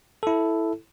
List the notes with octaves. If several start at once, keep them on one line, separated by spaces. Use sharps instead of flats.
E4 A4